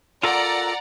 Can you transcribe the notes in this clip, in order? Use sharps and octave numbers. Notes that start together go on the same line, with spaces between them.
F4 A4 A#4 D5 F#5 A#5